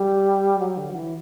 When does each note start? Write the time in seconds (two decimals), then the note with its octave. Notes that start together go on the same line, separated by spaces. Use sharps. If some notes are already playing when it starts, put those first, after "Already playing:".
Already playing: G3
0.59 F#3
0.77 D3
0.89 F#3
0.95 E3